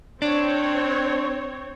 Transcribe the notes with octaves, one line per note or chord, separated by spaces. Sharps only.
C4 D4 C#5